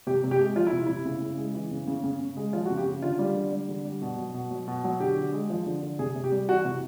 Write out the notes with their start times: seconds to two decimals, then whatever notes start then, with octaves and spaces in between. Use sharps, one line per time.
0.07 C3 G4
0.24 C3
0.31 G4
0.40 G#3
0.55 F3 F4
0.67 E4
0.72 C3
0.87 C3 E4
1.05 C#3
1.22 C#3
1.38 G#3
1.54 E3
1.71 C#3
1.87 C#3
2.04 C#3
2.20 C#3
2.37 G#3
2.53 F3 F4
2.65 F#4
2.70 C#3
2.77 G4
2.86 C#3
3.02 D3 F4
3.19 G3
3.36 D3
3.52 G3
3.69 D3
3.85 G3
4.02 B2
4.18 F#3
4.34 B2
4.51 F#3
4.68 B2
4.84 F#3
5.00 D3 G4
5.17 D3
5.33 G#3
5.50 F3
5.66 D3
5.83 D3
5.99 C3 G#4
6.16 C3
6.24 G4
6.31 G3
6.48 E3 F#4
6.65 C3